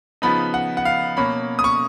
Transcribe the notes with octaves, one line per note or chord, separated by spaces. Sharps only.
C#3 F3 B3 D#4 B5
F#5
F#5
F5
B2 A#3 C#4 B5
D#6
C#6